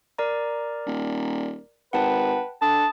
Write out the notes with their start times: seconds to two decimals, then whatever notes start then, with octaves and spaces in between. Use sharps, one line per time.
0.18 A#4 D5 A#5
0.86 D#1
1.93 G#1 B4 F#5 G5 A5
2.62 D3 A5 D#6